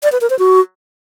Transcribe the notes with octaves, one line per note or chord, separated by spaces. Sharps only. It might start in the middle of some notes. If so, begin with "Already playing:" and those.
D5
B4
A#4
C5
F#4